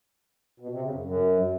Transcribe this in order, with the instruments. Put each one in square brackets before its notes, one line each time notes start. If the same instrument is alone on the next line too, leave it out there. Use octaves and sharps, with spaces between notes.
[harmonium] B2
C3
C#3
F#2
F#2